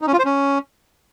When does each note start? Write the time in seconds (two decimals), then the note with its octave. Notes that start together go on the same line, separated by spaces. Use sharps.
0.01 D#4
0.07 C#4
0.13 F4
0.19 C5
0.25 C#4